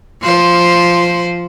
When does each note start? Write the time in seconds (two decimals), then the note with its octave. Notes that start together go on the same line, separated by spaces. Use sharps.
0.23 F3 C5